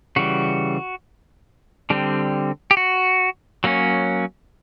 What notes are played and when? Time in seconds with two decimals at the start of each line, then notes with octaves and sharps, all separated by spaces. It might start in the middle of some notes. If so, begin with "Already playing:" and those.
0.16 C#3 E3 G3 F#4
1.90 D3 G3 C4
2.71 G4
2.77 F#4
3.64 F#3 A#3 C#4